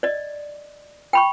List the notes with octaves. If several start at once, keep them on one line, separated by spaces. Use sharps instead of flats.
D5 D#5
G5 B5 C#6